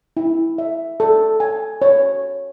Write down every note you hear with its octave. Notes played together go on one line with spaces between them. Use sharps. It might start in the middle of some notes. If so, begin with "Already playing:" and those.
E4
E5
A4
G#5
C#5